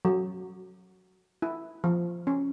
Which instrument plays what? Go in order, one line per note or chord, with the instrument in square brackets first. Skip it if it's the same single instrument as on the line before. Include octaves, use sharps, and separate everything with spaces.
[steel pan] F#3
E4
F3
C#4